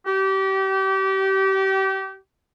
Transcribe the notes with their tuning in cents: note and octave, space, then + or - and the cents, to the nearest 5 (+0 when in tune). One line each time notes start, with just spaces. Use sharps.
G4 -30